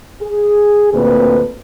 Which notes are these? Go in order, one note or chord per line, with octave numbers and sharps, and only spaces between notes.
G#4
D2 A#2 A#3 C4 B4